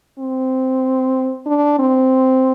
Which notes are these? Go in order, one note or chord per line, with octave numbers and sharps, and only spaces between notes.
C4
D4
C4